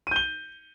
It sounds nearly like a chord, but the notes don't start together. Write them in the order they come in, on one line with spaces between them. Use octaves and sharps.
D#7 G6 G7